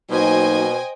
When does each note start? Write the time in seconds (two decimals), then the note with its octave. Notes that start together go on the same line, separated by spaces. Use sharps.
0.10 B2 F#3 A#3 D#4 C5 D#5 G5 G#5